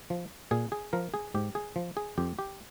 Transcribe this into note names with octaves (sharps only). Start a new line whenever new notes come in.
F3
A#2 G#4
G#4
F3 A#4
G#4
G#2 G4
G#4
F3
G#4
F2 G4
G4